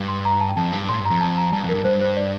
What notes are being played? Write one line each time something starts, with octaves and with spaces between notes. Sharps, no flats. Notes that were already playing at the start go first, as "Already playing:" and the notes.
Already playing: G2
C6
A#5
A5
G5
F2 A5
G2
A2 C6
G2
F2 A#5
A5
A#5
G2 A5
F2
A#4
G2
G2 C5
C5
D5